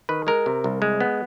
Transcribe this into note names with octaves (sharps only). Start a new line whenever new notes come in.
D#3 B4
G#3 A#4
C3
C2
G#3
B3